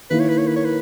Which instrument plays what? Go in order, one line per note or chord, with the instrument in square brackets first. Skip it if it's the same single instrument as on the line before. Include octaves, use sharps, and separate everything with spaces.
[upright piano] D#3 A#3 E4 A#4 [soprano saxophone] B4
[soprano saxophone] C#5
B4
C#5
B4
C#5
B4